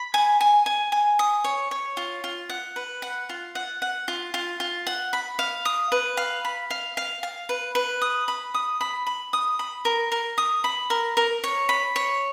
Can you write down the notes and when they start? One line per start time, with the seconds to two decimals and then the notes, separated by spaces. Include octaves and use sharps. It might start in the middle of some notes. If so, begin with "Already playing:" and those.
Already playing: B5
0.14 G#5
0.41 G#5
0.66 G#5
0.92 G#5
1.19 D#6
1.44 C#5
1.71 C#5
1.97 F4
2.24 F4
2.49 F#5
2.76 B4
3.02 F#5
3.29 F4
3.55 F#5
3.82 F#5
4.08 F4
4.34 F4
4.60 F4
4.87 F#5
5.13 B5
5.39 F5
5.65 D#6
5.92 B4
6.17 F5
6.45 B5
6.70 F5
6.97 F5
7.23 F5
7.49 B4
7.75 B4
8.01 D#6
8.28 B5
8.54 D#6
8.81 B5
9.07 B5
9.33 D#6
9.59 B5
9.85 A#4
10.12 A#4
10.38 D#6
10.64 B5
10.90 A#4
11.17 A#4
11.44 C#5
11.69 B5
11.96 C#5